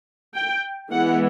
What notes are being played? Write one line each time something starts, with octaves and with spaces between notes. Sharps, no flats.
G5
E3 G#3 B3 F#5